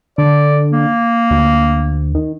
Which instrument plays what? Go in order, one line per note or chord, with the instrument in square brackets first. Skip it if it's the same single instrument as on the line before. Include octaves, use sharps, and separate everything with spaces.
[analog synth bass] D3 [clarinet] D5
[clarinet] A#3
[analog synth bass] D2
D#3